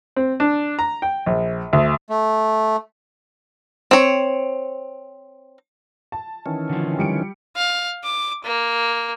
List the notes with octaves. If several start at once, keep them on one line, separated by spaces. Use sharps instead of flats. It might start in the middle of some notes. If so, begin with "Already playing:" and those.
C4
D4
A#5
G5
A#1
D2
A3
C4 C#5
A5
D#3 E3 C#4
D3 F3
G3 C#7 D7
F5
D6
A#3